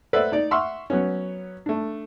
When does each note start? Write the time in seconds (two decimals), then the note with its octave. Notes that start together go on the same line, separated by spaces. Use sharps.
0.13 A4 B4 C5 D5 E5 F#5
0.32 D#4 D5
0.51 E5 F#5 C6 C#6 E6 F6
0.90 F#3 B3 C#4
1.66 A3 D4